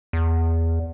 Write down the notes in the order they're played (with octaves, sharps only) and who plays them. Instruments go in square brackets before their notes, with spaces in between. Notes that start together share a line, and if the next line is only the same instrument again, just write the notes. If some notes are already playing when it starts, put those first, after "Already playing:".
[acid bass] E2